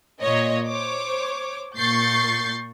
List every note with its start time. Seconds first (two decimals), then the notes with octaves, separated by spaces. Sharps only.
0.20 A#2 C#5 D#5
0.68 C5 C#5 D6
1.77 A#2 C#6 G6 A6 C7